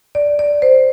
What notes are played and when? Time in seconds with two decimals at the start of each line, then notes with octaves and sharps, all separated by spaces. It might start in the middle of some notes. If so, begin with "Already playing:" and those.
0.15 D5
0.39 D5
0.62 C5